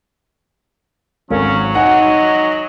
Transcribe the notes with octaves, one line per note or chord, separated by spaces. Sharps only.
G#1 F#3 C#4 A4 A#4 F5
D#4 D#5 F#5 G#5